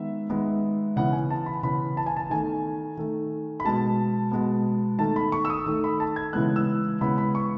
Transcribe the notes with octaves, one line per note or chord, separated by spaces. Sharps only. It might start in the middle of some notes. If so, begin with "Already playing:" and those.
Already playing: D#3 G#3 B3 E5
D#3 G#3 B3
C#3 E3 B3 F#5
G#5
A5
B5
C#3 E3 B3 B5
A5
G#5
A5
D#3 A3 G#5
D#3 A3
B5
B2 G#3 B3 A5
B2 G#3 B3
D#3 A3 A5
B5
C#6
E6
D#6
D#3 A3
B5
A5
G#6
C#3 E3 G#3 B3 F#6
E6
C#3 E3 G#3 B3 B5
B5
C#6